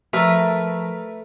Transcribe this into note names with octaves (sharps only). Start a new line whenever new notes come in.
F3 A3 A#4 B4 E5